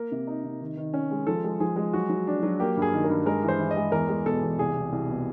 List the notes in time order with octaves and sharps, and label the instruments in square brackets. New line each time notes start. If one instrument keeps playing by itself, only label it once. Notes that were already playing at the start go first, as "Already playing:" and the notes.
Already playing: [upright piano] A#3 [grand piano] A#4
[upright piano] C3
D#4
C3
D#3
D#3
C#4
G#3
[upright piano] F3 [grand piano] A4
[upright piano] G#3
[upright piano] F3 [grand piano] G#4
[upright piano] G#3
[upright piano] F#3 [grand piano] F#4
[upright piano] F#3
D4
F#3
[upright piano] A#3 [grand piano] G4
[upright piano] G2
[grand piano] G#4
[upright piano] D#3
[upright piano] G2 [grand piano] A#4
[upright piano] G#3 [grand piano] A#4
[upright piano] E3
[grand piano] C5
[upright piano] E3
[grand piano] D#5
[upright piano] G#3
[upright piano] E2 [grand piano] A#4
[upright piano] G#3
[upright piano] B2 [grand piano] A4
[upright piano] E2
[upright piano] C2 [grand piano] G#4
[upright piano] B2
C2
B2